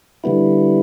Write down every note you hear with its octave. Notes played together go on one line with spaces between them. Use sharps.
D3 G3 B3 E4